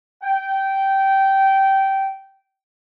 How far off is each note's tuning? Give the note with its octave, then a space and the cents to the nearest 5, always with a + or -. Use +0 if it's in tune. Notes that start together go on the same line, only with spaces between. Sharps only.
G5 -15